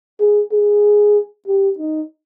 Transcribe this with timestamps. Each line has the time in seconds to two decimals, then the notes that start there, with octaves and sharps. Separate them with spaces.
0.20 G#4
0.52 G#4
1.47 G4
1.78 D#4